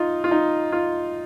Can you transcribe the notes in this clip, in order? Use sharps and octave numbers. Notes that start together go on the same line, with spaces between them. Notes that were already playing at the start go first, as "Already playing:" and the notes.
Already playing: D#4 F4
F4
D#4
F4